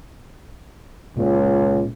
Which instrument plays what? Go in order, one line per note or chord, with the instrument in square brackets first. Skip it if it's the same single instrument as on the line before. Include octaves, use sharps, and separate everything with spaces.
[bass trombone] C#2 [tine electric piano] A#2